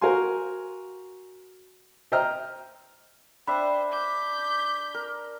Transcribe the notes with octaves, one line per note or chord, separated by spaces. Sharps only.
F#4 A#4 C5 F5 G#5 C6
C5 D#5 E5 G5 A#5 F6
D4 C5 E5 G5 B5
D6 G6 B6
A#4